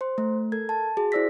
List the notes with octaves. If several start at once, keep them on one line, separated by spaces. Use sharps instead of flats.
C5 C6
A3
A4 A#4 G#6
A5
F#4 G#4
E4 C5 D5 E6 A#6 B6